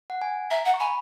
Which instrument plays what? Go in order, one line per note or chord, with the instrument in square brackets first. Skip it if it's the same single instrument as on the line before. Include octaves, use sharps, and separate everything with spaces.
[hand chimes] F#5
G#5
[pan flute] E5 [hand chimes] A#5
[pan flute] F#5
[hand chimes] C#6
[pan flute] G#5 [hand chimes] B5